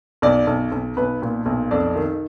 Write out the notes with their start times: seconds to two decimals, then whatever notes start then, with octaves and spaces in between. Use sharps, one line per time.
0.22 B1 D5
0.47 B1
0.72 B1
0.97 B1 B4
1.22 A#2
1.46 B1
1.71 F2 D5
1.96 D#3